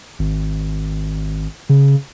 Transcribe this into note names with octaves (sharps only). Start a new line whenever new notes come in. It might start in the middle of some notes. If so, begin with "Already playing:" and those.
G#1
C#3